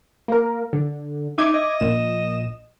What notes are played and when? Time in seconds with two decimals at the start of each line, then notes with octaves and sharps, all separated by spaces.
0.28 A#3 A#4
0.73 D3
1.38 D#4 E5 D6 G#6
1.54 D#5
1.80 A#1 A#2 E7